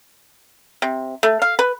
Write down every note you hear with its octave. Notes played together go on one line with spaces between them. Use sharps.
C3
A3
F5
B4